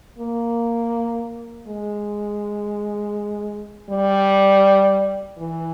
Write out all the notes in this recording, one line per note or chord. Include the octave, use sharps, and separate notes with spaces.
A#3
G#3
G3
E3